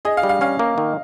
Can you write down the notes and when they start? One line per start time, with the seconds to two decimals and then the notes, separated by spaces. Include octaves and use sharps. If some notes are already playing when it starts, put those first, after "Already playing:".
0.05 G#4 D#5
0.17 F5
0.23 G3
0.29 F5
0.41 C#4 F5
0.59 A#3
0.78 D#3